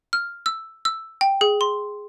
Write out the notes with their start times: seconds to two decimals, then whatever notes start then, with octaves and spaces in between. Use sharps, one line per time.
0.13 F6
0.46 E6
0.85 E6
1.21 G5
1.41 G#4
1.61 C6